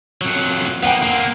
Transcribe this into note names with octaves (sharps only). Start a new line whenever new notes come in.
F2 F#3
A#3 B3 F#5 G5
A#3 C4